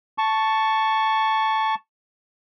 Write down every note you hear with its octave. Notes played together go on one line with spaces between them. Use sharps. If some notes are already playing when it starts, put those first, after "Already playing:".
A5 C#6